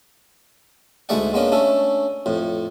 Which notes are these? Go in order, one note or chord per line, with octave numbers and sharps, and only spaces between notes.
D2 G#2 A3 G#4 D5 F#5
G#3 A#3 B3 C#4 D4
A3 C#4 D4 A4
F2 A2